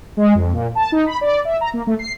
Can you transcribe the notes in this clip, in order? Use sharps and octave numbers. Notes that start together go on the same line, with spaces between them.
G#3
F2
A#2
A5
D#4
B5
D5
E5
A#5
A#3
A3
C7